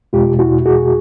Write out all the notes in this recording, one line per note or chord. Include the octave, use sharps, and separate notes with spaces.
E2 B2 G#3 F4 G4
E4 F#4
F#4 G#4